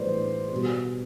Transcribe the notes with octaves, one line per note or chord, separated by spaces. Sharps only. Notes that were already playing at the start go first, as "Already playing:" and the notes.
Already playing: A2 E3 G3 B4 C5 D5
B2 G3